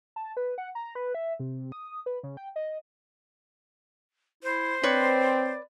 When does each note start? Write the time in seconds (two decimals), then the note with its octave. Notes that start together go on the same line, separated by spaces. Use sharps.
0.16 A5
0.37 B4
0.58 F#5
0.75 A#5
0.95 B4
1.15 E5
1.40 C3
1.72 D#6
2.06 B4
2.23 C#3
2.37 G5
2.56 D#5
4.43 E4 C5
4.83 C4 B4 C#5 D5